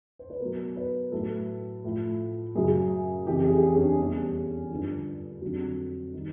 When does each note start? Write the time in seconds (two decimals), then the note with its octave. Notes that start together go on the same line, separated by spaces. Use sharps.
0.19 C5
0.30 B4
0.40 B2 F#3 A#4
0.76 B4
1.12 A2 F#3 A4
1.84 A2 F3
2.55 F#2 C#3 F#3 G#4
3.27 F2 C#3 E3 G4
3.45 G#4
3.57 G4
3.63 G#4
3.75 C#4
3.81 D4
3.99 E2 B2 G3 C#4
4.70 G2 D3 F3
5.42 F2 D3 F#3
6.13 D#3 G3 D#4